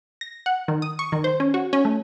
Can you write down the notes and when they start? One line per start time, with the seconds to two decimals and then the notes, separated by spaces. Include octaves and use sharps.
0.21 A#6
0.46 F#5
0.68 D#3
0.82 D#6
0.99 C#6
1.12 D#3
1.24 C5
1.40 C#4
1.54 F#4
1.73 C#4
1.85 A3